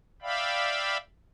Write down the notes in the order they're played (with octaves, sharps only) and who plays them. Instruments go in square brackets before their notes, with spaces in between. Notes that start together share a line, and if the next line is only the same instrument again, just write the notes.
[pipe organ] D5 E5 F5 G5 B5